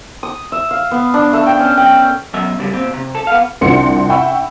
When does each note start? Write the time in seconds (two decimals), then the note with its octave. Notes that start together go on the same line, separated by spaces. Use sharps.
0.23 D#6
0.52 E5
0.71 F5
0.91 B3
1.14 D4
1.33 A3
1.46 G5
1.59 C#4
1.77 G5
2.34 B1 F#2 E5
2.59 C#3 G3
2.73 A#2 C4
2.93 C3
3.15 A4
3.27 B3 F5
3.61 C2 F3 D4 F#5 C6 C#7
4.09 E5 F#5 G5 B5 C#6 E6